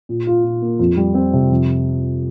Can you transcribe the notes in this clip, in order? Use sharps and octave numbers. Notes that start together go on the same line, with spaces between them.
A#2
F4
A#2
A#3
F2
G3
C4
C3
F2